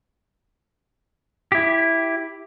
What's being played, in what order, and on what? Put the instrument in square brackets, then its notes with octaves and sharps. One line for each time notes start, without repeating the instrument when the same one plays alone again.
[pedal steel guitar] E4 G4